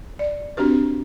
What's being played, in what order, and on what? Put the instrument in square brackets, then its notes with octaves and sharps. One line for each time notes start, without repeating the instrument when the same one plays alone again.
[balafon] D5
C4 D4 F#4 G4 B4